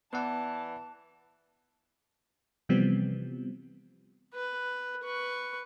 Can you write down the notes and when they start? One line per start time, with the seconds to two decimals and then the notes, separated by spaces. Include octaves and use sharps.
0.13 E3 B3 B4 D5 F#5 A5
2.69 C3 E3 F3 G3 B3 C4
4.34 B4
5.03 B4 C#6